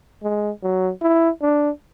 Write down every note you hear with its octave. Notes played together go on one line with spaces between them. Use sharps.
G#3
F#3
E4
D4